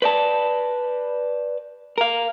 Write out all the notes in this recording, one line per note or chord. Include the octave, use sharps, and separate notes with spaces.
B4 D5 A5
A#4 F5